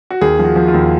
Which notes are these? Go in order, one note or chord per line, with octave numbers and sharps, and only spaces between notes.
F#4
D#2 G#4
F3
F#4
F3
F4
D#2